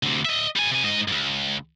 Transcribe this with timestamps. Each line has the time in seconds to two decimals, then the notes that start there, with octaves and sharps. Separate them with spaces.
0.03 D2 C3
0.25 D#5 E5
0.56 G3 G#5
0.71 C3 G#5
0.84 G#2 D#5
1.08 C#2 G2